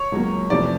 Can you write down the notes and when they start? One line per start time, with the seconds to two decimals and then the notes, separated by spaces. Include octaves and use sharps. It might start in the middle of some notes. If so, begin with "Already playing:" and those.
Already playing: C#5
0.12 C#2 B2 F#3 A#3
0.50 F2 C3 E3 A3 D5